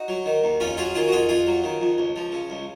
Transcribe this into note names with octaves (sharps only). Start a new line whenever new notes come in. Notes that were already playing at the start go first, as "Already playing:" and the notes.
Already playing: D#4 F#4
F#3
D#3
D#2
F2 C#4 F4
F#3 F4 G#4
D#3 F4 G#4
F#4
F2 F4 G#4
F2 F4 G#4
F#3
D#3
F2
C#2
F3
C#3
C#2